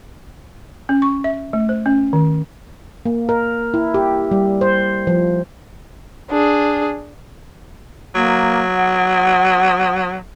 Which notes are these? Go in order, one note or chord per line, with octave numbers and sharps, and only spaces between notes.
C#4
C#6
E5
A3
C5
C#4
D#3
A#3
A#4
E4
G4
G3
C5
F3
D4 G#4
F#3 A#3
F#5